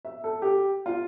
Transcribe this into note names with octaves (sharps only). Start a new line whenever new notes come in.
E5
A4
G4
F4